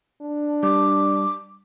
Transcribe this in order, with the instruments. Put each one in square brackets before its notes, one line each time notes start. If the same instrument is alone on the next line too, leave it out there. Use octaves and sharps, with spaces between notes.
[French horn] D4
[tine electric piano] G3 [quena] D6